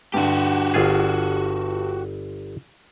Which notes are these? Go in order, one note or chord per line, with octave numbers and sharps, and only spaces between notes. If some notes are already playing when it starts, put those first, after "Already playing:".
G2 D3 F#4 G4
G1 F4 G#4